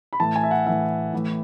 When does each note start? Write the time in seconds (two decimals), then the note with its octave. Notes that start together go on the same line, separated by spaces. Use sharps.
0.13 B5
0.20 A2 E3 A5
0.36 G#5
0.43 E5
0.51 F#5
0.66 A2 E3 E5
1.13 A2 E3